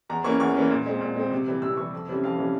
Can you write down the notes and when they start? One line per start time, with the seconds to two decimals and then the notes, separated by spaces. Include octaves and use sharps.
0.10 E2 A#5
0.24 E3 A#3 C#4 C#6
0.40 E2 C#6
0.55 E3 A#3 C#4
0.70 A#2
0.86 G#3 C4
1.01 A#2
1.16 G#3 C4
1.32 C3
1.47 E3 G3
1.62 C3 E6
1.77 E3 G3 C#6
1.93 F2
2.08 C3 E3 G3 C#4
2.23 F2 F5
2.38 C3 E3 G3 C#4